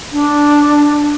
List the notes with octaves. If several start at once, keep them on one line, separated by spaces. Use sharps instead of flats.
D4